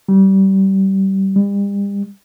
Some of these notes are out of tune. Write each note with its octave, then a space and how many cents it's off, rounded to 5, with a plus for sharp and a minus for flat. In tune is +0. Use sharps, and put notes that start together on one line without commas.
G3 -25
G3 +40